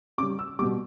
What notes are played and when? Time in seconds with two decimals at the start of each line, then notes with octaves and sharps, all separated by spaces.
0.18 C#3 D6
0.23 G3
0.39 E6
0.59 G3 D6
0.62 B2